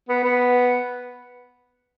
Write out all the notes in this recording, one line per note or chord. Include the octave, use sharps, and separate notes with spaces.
B3
B3